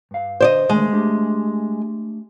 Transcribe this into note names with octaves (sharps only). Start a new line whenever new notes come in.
G2 F5
D3 C5 D5 D#5
D#2 D3 G#3 A3
A3 D4 G4